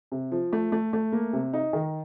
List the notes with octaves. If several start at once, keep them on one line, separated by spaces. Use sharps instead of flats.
C3
F3
A3
A3
A3
A#3
C3
D#4
D#3